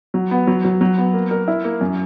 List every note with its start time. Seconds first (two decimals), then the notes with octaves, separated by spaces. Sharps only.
0.14 F#3
0.31 B3
0.47 F#3
0.65 F#3
0.81 F#3
0.98 B3
1.14 A#3
1.31 A#4
1.48 E4
1.64 A#3
1.81 F#2